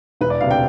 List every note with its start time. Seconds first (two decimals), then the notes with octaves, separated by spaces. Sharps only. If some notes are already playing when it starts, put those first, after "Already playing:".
0.21 E1 B4
0.30 D5
0.41 D2 C3 F5
0.51 G5